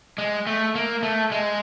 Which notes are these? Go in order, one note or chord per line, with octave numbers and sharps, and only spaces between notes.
G#3
A3
A#3
A3
G#3